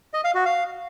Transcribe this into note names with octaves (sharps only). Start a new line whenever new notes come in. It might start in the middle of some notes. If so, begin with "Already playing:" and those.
D#5
F5
F#4
F5